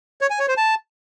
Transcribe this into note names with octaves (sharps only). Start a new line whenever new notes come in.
C#5
G#5
C#5
C5
A5